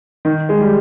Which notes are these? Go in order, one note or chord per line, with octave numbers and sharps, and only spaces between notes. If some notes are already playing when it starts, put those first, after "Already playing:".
D#3
G#3
G3